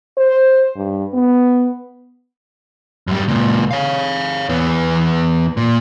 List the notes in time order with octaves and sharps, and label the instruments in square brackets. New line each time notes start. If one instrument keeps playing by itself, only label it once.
[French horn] C5
G2
B3
[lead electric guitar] F#2 G3
C#2 A#2
C#5 F5
E2 B3
A#2